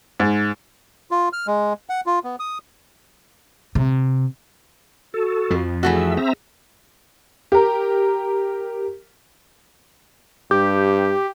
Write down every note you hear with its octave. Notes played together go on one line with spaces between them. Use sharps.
G#2
F4
F6
G#3
F#5
F4
B3
D#6
C3
F#4 A4
F2 F3
E3 A3 F#4 G#4 E5
C4 E5 A#5
G4 A#4
G2 G4